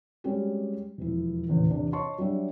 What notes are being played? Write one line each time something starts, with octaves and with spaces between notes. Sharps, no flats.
G3 G#3 C4 C#4 F#4 G4
E1 F2 E4
D#1 A1 E2 A2 C#3
E2 C3 D4
C#5 D#5 A5 C6 C#6
F#3 G3 D4 E5